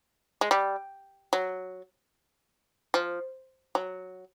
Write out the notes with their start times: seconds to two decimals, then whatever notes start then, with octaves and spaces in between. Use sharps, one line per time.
0.41 G#3
0.51 G3
1.33 F#3
2.94 F3
3.75 F#3